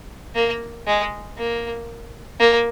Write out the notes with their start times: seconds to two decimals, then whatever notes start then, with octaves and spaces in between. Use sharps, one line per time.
0.35 A#3
0.87 G#3
1.38 A#3
2.40 A#3